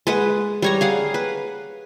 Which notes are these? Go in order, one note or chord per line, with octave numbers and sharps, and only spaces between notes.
G#3 B4 F#5
G3 C#5 A#5
G#4 F5 F#5
B4